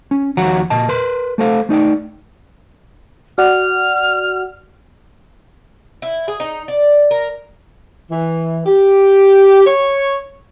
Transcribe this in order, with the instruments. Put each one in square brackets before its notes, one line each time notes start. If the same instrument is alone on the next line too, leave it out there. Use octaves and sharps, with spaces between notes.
[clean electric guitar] C#4
D#2 F3 F#4 C#5 F#5 A#5
A#2 D#5 A5
A#4 B4 C6
A3 A4 C5 F5
A3 D#4 D5 G5
[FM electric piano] F#4 D5 F#5 [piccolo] F6
[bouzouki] E4
G#4
D#4
D5
A#4
[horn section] E3
G4
C#5